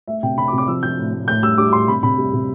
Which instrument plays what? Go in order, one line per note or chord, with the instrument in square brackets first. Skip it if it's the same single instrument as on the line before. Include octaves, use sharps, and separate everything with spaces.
[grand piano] A3 E5
C3 G5
C3 B5
D6
C3
D6
F3 E6
F3 G6
A2
A2
A2 G6
G3 E6
G3 D6
A2 C6
C3 B5
C3 B5
G3
C3